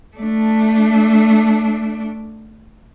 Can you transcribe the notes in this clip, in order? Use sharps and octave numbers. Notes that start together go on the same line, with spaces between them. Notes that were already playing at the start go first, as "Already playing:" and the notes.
A3 D4